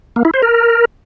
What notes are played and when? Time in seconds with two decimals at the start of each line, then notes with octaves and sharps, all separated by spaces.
0.16 A#3
0.25 E4
0.34 C5
0.42 A#4